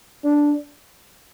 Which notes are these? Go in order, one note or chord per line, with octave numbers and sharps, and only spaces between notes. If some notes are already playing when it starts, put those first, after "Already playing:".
D4